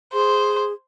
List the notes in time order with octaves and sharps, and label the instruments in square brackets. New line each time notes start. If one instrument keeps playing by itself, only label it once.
[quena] G#4 [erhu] C5